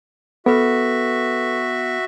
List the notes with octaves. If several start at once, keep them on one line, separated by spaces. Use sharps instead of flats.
B3 F#4 A4 B4 E5 C#6